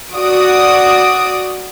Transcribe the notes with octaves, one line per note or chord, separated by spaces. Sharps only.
F#4 D5 D#6 D7